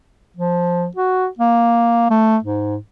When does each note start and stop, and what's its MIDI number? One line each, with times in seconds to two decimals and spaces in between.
0.37 0.87 53
0.97 1.27 66
1.39 2.06 58
2.10 2.37 57
2.44 2.77 44